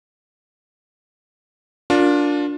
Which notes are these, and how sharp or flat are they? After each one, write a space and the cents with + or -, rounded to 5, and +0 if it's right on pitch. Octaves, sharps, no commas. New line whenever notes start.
D4 -10 F4 +25 A#4 -5